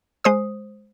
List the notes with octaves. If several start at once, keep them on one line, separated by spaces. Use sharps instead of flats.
G#3 C5 D#6